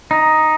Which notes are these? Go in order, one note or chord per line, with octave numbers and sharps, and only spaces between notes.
D#4